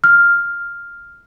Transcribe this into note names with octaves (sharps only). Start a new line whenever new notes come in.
F6